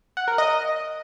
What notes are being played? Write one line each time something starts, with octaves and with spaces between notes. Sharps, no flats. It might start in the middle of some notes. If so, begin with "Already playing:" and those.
F#5
A#4
D#5